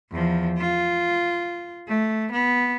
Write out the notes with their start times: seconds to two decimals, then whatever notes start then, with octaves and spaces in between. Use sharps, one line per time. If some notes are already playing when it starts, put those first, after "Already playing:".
0.11 E2 F3
0.57 F4
1.88 A3
2.32 B3